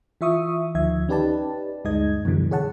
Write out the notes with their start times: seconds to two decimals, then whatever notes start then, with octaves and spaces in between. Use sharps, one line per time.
0.21 E3 F4 E5 C#6 D#6
0.75 D2 D#3 F3 E5 G#6
1.09 C#4 D#4 G4 B4 D5 A5
1.85 D2 G2 G#3 D#4 D#5 G#6
2.25 F#2 B2 D3 E3 G3
2.51 G#4 C#5 F#5 A5